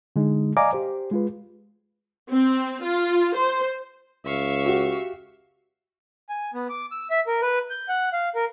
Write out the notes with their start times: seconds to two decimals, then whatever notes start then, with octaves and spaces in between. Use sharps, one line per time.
0.16 D3 G#3 D#4
0.57 D5 D#5 F5 G#5 A#5 D6
0.73 G4 C5
1.11 G#3 F4 B4
2.30 C4
2.84 F4
3.35 C5
4.25 C#2 E5 F5 C#6
4.66 F#4 G4
6.29 G#5
6.54 B3
6.69 D6
6.91 E6
7.10 E5
7.27 A#4
7.42 B4
7.70 G6
7.89 F#5
8.13 F5
8.35 A#4